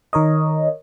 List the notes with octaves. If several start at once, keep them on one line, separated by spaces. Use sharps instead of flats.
D#3 A#4 C#5 D#5